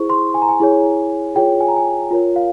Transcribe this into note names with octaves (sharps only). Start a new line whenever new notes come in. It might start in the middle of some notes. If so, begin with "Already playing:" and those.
Already playing: E4 G#4 C5 C#6
C6
G#5
A#5
G#5
E4 G#4 C#5
F4 G#4 C#5 G5
G#5
A#5
G#5
F4 A#4 C#5
F5